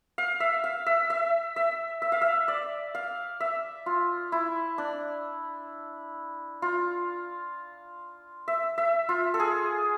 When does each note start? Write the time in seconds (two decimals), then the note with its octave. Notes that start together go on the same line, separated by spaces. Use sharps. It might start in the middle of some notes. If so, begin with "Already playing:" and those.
0.18 F5
0.40 E5
0.64 F5
0.86 E5
1.10 E5
1.56 E5
2.02 E5
2.12 F5
2.21 E5
2.48 D5
2.95 F5
3.40 E5
3.86 F4
4.32 E4
4.78 D4
6.62 F4
8.48 E5
8.78 E5
9.09 F4
9.34 A4
9.40 G#4